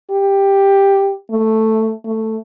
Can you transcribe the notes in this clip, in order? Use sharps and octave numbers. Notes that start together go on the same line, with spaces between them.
G4
A3
A3